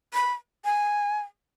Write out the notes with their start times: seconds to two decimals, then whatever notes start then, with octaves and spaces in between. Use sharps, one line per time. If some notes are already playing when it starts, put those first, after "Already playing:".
0.14 B5
0.65 G#5